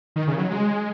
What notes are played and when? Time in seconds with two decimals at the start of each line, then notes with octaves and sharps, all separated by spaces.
0.16 D#3
0.28 C#3
0.38 F#3
0.49 G#3